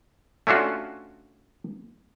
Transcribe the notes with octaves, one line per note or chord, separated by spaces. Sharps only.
A3 C#4 D4 F4 F#4